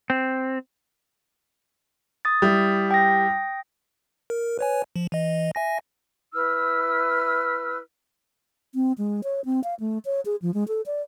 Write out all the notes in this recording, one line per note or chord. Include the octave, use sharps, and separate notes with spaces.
C4
D#6 A6
G3 E4
G5 D#6 A#6
A#4
B4 C#5 G#5
F3
E3 D#5
E5 G#5 A#6
E4 B4 E6 F6
C4
G#3
C#5
C4
F5
A3
C#5
G#4
F3
G#3
A4
D5